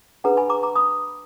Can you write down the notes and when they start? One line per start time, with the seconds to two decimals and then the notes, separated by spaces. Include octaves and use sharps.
0.24 D4 G#4 B4 F#5 A#5
0.37 G#5 B5
0.50 A#5 D6
0.63 A#5 D6
0.76 B5 D#6